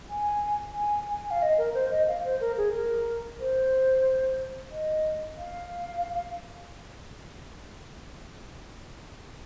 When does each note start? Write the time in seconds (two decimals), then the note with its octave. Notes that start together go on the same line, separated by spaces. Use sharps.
0.10 G#5
0.76 G#5
1.09 G#5
1.31 F5
1.42 D#5
1.58 A#4
1.74 C5
1.91 D#5
2.08 F5
2.25 C5
2.41 A#4
2.57 G#4
2.74 A#4
3.40 C5
4.71 D#5
5.37 F5